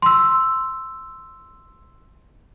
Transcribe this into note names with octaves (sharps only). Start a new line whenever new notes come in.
C6 E6